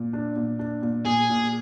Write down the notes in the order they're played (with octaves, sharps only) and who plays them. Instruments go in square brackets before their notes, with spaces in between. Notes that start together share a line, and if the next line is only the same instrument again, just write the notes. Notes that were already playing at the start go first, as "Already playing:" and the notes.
Already playing: [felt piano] A#2
D4
A#2
D4
A#2
[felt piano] A#2 [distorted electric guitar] G#4
[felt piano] A#2